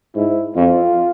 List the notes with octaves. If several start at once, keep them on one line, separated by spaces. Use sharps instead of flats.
G#2 E4
F2 F4